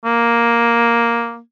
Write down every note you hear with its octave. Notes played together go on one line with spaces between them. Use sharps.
A#3